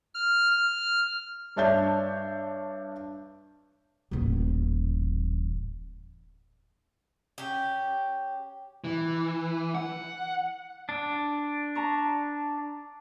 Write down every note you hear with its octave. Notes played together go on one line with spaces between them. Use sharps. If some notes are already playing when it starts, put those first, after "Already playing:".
F6
F6
G2 D4 C#5 E5 A5 G6
D#1 A1
C#4 G4
E3
F#5
D4
A5 A#5 C#6